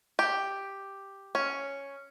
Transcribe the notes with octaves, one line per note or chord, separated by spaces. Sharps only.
G4
C#4